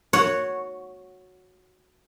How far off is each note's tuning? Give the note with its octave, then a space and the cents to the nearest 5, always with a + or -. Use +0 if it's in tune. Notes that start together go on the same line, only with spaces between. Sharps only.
F#4 -10 C#5 +0 F#5 +0